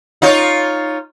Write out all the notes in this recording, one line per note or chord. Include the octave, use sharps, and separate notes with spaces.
D#4 F4 C#5